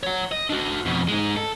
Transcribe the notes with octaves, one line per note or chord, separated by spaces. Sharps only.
C#5 F#5
D#5
D4 F#4
F2 B2
G#3 D#4
A4